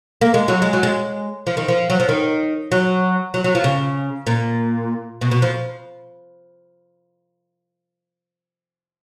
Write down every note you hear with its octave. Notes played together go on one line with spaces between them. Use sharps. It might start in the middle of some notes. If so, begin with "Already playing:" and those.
A#3
G#3
F#3
G#3
F#3
G#3
F3
D#3
F3
F#3
F3
D#3
F#3
F#3
F#3
F3
C#3
A#2
B2
B2
F3